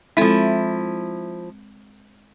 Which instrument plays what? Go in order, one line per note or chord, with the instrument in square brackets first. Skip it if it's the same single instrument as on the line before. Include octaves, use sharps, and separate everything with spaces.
[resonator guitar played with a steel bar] F3 E4 [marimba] G#3 C4 A4